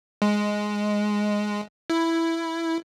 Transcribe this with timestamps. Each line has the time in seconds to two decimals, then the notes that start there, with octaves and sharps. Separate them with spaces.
0.22 G#3
1.90 E4